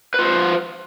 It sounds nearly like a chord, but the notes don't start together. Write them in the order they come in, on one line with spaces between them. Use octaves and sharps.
B4 F4 C5